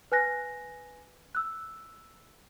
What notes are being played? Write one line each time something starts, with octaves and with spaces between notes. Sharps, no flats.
B4 G#5 F#6 A#6
E6 F#6